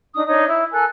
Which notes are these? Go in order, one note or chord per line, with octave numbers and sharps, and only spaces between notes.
D4 D#4 D#6
D4 D#4 C#5
E4
A4 A#4 G#5 F#6